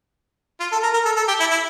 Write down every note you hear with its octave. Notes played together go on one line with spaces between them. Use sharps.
F4
A4
A#4
A#4
A4
A4
G4
E4
E4